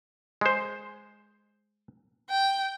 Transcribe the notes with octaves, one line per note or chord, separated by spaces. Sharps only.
G#3 C5
G5